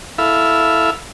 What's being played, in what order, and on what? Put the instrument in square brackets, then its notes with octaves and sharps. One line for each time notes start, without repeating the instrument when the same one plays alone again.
[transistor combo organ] E4 A4 E5 F5 B5